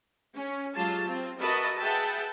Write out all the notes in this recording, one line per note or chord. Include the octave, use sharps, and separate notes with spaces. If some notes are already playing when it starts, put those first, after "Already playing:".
C#4
F#3 G#3 F4 G4 A5
C4 F4
F#4 A#4 B4 D#5 E5 A5
G#4 B4 E5 F#5 G5 A5